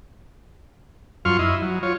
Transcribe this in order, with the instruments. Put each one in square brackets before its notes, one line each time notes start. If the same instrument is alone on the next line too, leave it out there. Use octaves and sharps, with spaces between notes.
[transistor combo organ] F#2 F4 C6 C#6 F6
E4 D#5
F#3
F4 C#5